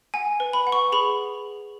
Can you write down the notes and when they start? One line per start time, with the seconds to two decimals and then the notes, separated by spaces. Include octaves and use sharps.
0.14 F#5 G#5
0.40 B4
0.53 B5
0.67 F#5
0.72 C#6
0.92 G#4 B5